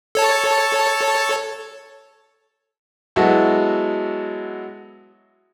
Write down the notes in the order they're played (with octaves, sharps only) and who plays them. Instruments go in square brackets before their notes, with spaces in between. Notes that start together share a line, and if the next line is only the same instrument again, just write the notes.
[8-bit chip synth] A4 C#5 A5
[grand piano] F#3 G#3 B3 E4 F#4 A4